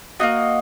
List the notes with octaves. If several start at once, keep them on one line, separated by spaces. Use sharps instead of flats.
A#3 D#4 F#4 D#5